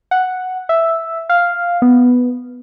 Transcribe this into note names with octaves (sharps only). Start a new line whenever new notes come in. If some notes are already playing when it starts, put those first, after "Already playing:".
F#5
E5
F5
B3